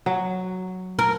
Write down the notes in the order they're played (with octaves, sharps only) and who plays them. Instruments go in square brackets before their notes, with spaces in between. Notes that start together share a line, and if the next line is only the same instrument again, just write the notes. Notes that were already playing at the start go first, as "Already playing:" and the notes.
[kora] F#3
[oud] A#4